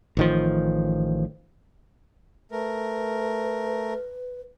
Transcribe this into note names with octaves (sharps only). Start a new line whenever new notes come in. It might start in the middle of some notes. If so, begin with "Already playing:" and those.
A1 D#3 F3
A3 A#4 B4